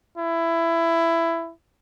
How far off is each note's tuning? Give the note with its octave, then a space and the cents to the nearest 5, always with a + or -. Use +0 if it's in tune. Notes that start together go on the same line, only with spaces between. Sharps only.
E4 +15